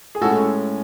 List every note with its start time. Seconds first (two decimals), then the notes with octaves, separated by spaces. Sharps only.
0.15 G#4
0.21 A2 G#3 C#4 F#4 A4